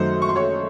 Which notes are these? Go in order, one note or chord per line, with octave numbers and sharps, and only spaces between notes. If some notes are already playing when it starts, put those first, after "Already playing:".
Already playing: F#2 D#3 F#3 A3 C5
C#6
C6
C#5 C#6